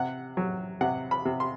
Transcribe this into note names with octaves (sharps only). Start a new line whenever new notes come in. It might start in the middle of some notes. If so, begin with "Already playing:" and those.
Already playing: C3 F#5
F#3
C3 F#5
B5
C3
C6